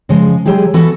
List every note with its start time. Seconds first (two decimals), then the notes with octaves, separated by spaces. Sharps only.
0.09 C#3 F3 G#3
0.45 F#3 G#3 G4 G#4
0.74 E3 B3 F#4 A4 B4